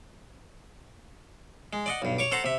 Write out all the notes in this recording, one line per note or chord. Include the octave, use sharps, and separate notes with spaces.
G#3
D5 D#5 F#5
B1 G2
C#5 C#6 D6
A4 C5 F#5 A5 A#5
C3 E5